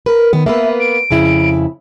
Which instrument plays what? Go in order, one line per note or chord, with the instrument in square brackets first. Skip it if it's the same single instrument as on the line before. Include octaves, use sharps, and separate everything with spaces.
[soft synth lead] A#4 [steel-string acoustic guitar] B4
[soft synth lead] D#3 [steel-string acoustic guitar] B3
[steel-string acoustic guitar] A#3 B3 B4 [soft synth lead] E5
[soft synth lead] D7
[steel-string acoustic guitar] F2 C#3 E4